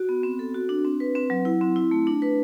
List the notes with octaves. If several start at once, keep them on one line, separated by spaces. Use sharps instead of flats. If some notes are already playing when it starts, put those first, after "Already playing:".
Already playing: F#4
B3
C4
A4
F#4
D4
C4
B4
C4
F#3
E4
C4
E4
A3
D4
B4